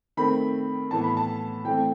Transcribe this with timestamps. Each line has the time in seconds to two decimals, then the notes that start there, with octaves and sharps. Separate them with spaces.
0.17 D#3 A3 C4 B5
0.91 A2 E3 B3 A5
1.04 B5
1.17 A5
1.65 E3 A3 C4 G5